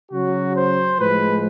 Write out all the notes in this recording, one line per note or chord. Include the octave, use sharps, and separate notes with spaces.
C#3 F#3 F#4
C5
A2 F3 G#3 B4